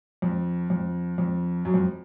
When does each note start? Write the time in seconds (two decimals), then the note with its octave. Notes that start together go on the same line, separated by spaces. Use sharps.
0.22 F2
0.70 F2
1.18 F2
1.65 F#2
1.74 F2